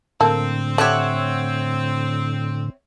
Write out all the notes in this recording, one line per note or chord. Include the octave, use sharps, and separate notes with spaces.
A2 D3 A#3 C4 A4
A3 G4 C#5 E5 F#5